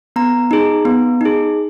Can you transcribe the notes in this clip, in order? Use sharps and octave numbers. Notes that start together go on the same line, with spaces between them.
B3 A#5
D#4 G#4
B3
D#4 G#4